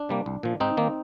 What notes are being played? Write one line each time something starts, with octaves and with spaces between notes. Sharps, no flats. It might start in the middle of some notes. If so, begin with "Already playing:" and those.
Already playing: D4
C3 G3 A#3
C2
A#2 F3
G#2 C4 D#4
D#3 A#3